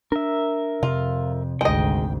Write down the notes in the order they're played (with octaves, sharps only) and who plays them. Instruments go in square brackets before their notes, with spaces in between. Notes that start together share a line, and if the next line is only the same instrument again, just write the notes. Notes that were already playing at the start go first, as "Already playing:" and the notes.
[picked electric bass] D4 [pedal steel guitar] A#4 E5
[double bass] F2 [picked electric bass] C3 [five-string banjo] F4
[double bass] G#1 D2 [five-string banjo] G#3 D#5 [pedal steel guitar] G5